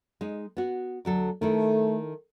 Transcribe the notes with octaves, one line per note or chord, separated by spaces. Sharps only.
G#3 D#4
B3 F#4
D2 F#3 A4
D#3 A3 E4 A4